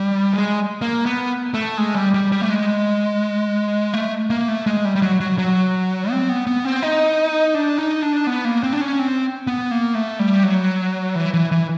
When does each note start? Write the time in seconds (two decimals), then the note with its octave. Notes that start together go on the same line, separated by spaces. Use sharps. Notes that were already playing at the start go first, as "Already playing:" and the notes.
Already playing: G3
0.33 G#3
0.81 A#3
1.06 B3
1.54 A3
1.78 G#3
1.95 G3
2.14 G3
2.32 G3
2.41 A3
2.50 G#3
3.94 A3
4.30 A#3
4.48 A3
4.66 G#3
4.85 G3
4.96 G3
5.02 F#3
5.20 F#3
5.38 F#3
6.11 C4
6.29 B3
6.47 B3
6.65 C4
6.83 D#4
7.55 D4
7.78 D#4
8.02 D4
8.27 B3
8.45 A#3
8.63 C4
8.73 D4
8.81 C#4
8.99 C4
9.47 B3
9.71 A#3
9.95 A3
10.19 G3
10.43 F#3
11.15 E3
11.34 E3
11.52 E3